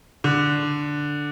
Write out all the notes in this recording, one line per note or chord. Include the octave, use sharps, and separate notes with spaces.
D3